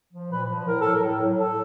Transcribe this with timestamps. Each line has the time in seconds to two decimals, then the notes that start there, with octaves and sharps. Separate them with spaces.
0.12 F3
0.31 A#2 B4
0.49 F3
0.67 A2 A#4
0.80 F#3 A4
0.94 A#4
1.03 A2
1.22 F#3
1.39 A4